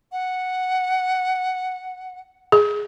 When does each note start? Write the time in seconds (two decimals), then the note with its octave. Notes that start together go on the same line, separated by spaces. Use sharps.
0.12 F#5
2.52 G#4